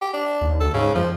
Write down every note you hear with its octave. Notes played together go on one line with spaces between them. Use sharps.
G4
D4
D#2
D2 A4
G#2 C#3
F2 F3